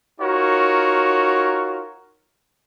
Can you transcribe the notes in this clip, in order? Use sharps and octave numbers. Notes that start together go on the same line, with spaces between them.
D#4 F4 F#4 A#4 C#5